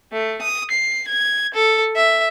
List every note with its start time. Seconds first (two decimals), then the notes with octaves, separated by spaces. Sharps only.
0.13 A3
0.42 D#6
0.71 C7
1.08 G#6
1.55 A4
1.96 E5